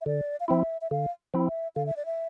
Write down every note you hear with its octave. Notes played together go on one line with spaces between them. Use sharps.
E5
D3 D5
F5
F3 C4 E4 E5
E5
D3 F5
F3 C4 E4
E5
D3 F5
E5
D5
E5